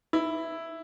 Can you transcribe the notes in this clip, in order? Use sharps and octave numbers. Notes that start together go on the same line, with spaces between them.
E4